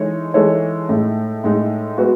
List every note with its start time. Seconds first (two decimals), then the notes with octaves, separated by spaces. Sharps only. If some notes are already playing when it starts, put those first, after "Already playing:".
Already playing: E3 G#3 D#4 A4 C#5
0.34 E3 G#3 D#4 A4 C#5
0.89 A2 G#3 D#4
1.44 A2 G#3 D#4
1.98 G#3 B3 F#4